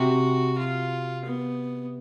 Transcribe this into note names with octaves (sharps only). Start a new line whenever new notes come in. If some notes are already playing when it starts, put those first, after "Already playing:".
Already playing: C3 F#4
F4
B3